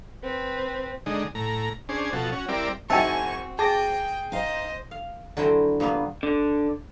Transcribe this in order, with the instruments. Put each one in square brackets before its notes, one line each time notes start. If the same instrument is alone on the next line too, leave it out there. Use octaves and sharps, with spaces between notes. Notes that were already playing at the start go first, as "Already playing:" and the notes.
[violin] C4 B4
[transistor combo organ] D3 G#3 D#4
A2 A#5
C#4 D4 G#4 C5
B2 F3 F#4 A4
C#4 F#4
G3 C4 E4 A#4 D5
[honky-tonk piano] F#1 G#5 [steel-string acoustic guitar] C4 F#4 [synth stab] D#4 E5 A5 [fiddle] C#6
[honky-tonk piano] G#4 [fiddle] G5 [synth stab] A5 D6 A#6
[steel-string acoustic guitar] D#4 F5 [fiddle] C5 D#5
[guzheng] F5
D3 F#3 C4 E4 C5 G5
G2 F3 A#3 B3
[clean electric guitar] D3